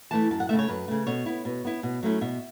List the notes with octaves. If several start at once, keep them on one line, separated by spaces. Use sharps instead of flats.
E3 A3 E4 A5
F#2 A5
F#5
C#3 A3 E5
C#5
F#2 B4
C#3 A3
B2 C#5
B3 E4
B2
B3 E4
B2
F#3 A3 C#4 E4
B2 E5